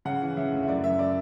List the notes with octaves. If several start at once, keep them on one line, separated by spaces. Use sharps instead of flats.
C#3 F#5
E3
C#3 E5
D2
E5
F#2 D5
F#2 E5
D5